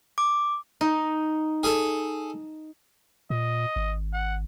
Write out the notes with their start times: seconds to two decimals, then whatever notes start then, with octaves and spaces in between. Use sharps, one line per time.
0.18 D6
0.81 D#4
1.63 G#4 A4
3.30 A#2 D#5
3.76 G#1
4.13 F#5